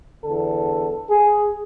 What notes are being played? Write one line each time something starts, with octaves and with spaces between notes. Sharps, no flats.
E2 D3 A4
G#4